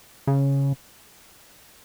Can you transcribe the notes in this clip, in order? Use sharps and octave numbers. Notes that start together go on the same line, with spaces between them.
C#3